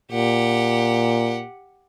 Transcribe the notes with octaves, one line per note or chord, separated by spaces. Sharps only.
A#2 G4 F#5